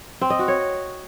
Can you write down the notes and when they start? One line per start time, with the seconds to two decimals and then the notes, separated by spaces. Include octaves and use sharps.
0.21 C4
0.30 D#5
0.39 F#4
0.48 C#5